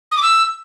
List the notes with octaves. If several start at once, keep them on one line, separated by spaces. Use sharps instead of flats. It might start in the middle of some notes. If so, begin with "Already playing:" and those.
D#6
D6
E6